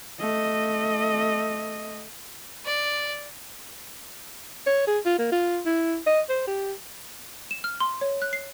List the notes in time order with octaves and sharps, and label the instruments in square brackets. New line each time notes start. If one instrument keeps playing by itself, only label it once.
[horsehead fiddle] A3 D#5
[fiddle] D5
[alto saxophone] C#5
G#4
F4
A#3
F4
E4
D#5
C5
G4
[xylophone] E7
F6
C6
C#5
F#6
C7